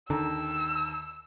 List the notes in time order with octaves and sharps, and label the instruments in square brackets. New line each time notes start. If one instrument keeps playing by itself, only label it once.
[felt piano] D#2 A5 A#5 [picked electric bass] D3 [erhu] E6